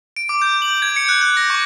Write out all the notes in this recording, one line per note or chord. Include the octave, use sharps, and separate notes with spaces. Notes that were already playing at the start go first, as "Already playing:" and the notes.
D7
D6
G6
F#7
G#6
C#7
F#6
F#6
A#6
C#6